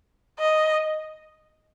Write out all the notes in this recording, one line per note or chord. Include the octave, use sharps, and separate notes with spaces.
D#5